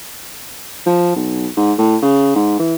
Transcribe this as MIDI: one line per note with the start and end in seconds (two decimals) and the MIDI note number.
0.86 1.16 53
1.16 1.47 35
1.57 1.73 44
1.78 1.97 45
2.02 2.35 49
2.36 2.55 44
2.59 2.75 52